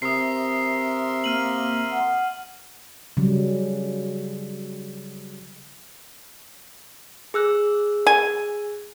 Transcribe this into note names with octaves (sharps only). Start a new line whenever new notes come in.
C3 A#4 E5 C6 D#6 C7
A#3 F6 D#7 F#7
F#5
C#3 F#3 G3
G#4 E6 F#6
G#5